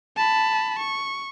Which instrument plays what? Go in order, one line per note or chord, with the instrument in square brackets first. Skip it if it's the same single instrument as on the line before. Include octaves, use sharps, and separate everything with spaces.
[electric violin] A5 B5
C#6